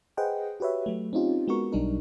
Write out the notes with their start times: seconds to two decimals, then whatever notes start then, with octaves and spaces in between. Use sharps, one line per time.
0.17 G#4 B4 C5 D#5 F#5 G5
0.60 F#4 G4 B4 C#5 E5
0.86 F#3 A3
1.13 C4 C#4 D#4 F4 G4
1.48 G#3 B3 F#4 A#4 C#6
1.72 B1 F#3 G3 D4 D#4 A#4